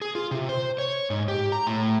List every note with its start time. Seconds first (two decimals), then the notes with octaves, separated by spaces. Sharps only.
0.02 G#4
0.15 F4
0.31 C3
0.49 C5
0.78 C#5
1.10 G#2
1.28 G4
1.52 A#5
1.67 A2